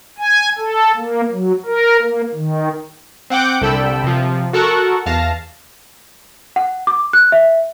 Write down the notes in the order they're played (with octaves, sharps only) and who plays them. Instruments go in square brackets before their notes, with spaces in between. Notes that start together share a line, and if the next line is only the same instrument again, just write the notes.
[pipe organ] G#5
A4
A#3
F#3
A#4
A#3
D#3
[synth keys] C4 F#5 G5 D6 G6
C2 D3 A4 G5 B5 E6
C3 F3
F#4 A4 A#4 F#5 C#6
E2 F5 A5 A#6
[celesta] F#5
D6
F#6
E5